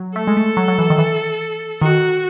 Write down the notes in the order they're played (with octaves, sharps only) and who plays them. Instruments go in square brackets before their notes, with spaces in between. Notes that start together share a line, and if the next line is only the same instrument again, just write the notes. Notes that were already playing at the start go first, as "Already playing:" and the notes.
Already playing: [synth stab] F#3
[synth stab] A3 [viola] A4
[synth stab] G#3
A3
F#3
F#3
E3
D#3
E3
[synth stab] D#3 [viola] F#4